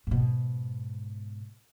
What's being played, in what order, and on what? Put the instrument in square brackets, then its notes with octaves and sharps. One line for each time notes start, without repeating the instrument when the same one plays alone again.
[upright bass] G#2 B2